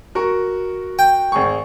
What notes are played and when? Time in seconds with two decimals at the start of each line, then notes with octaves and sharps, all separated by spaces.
0.15 F#4 A#4 C#6
0.99 G5
1.32 G#1 G#4 C#6